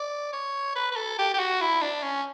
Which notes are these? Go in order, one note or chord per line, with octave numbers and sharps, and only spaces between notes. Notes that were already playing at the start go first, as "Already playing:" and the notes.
Already playing: D5
C#5
B4
B4
A4
G4
G4
F#4
E4
D4
C#4